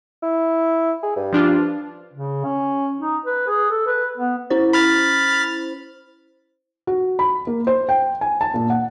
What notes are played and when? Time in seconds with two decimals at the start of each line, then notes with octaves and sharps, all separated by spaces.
0.23 E4
1.03 G#4
1.16 G2
1.33 F3 D4 F4
2.14 C#3
2.45 C#4
3.00 D#4
3.26 B4
3.48 G#4
3.71 A4
3.87 B4
4.18 B3
4.50 C#4 E4 C5
4.73 B5 F6 A6
6.87 F#4
7.19 B5
7.47 A#3
7.67 C5
7.89 G5
8.21 G#5
8.41 A5
8.54 A#2
8.70 F#5